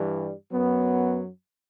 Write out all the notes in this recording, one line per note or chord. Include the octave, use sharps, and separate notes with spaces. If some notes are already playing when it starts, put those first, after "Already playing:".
Already playing: G2 E3 G3
F#2 F#3 B3